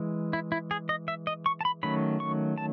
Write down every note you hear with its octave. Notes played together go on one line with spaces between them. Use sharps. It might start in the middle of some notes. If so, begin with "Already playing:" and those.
Already playing: E3 G#3
E4
E4
G#4
D#5
E5
D#5
C#6
A5
B5
D#3 F#3 A3 C#4 B5
C#6
A5